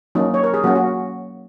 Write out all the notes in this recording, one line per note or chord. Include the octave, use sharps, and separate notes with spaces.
F#3 A#3 C#4 D#4
C#5
A#4
G#4
F#3 A#3 C#4 F#4
F#4